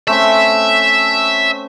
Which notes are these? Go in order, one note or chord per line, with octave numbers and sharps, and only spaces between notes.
A3 C4 C#4 E5